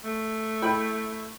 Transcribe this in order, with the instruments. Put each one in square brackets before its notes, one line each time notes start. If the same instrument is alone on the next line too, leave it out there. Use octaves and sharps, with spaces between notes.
[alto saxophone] A3
[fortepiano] E4 G5 B5